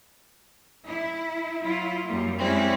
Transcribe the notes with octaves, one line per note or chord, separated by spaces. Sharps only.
E4
F#3 E4 F4
F#2 G3 A#3
G3 G#3 C4 C#4 E4